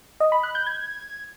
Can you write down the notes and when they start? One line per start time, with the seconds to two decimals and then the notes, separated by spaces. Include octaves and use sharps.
0.20 D#5
0.32 B5
0.43 F#6
0.55 G6
0.66 G#6